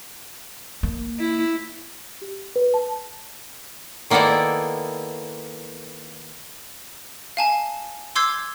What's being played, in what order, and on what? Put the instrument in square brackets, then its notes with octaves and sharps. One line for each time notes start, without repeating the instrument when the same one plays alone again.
[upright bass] A#3
[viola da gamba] E4
[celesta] G4
B4
A5
[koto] D#3 A#3 B3 E4 A4 D5
[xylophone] F5 G#5 A5
C6 D6 E6 G6 G#6 C7